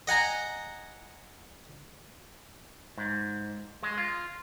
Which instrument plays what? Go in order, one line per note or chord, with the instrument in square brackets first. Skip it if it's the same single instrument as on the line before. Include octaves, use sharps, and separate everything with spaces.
[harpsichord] D#5 F#5 G#5 A#5
[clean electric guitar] G#2
G#3
F4